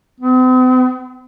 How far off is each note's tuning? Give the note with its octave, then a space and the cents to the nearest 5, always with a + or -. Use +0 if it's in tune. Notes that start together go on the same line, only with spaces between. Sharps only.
C4 -45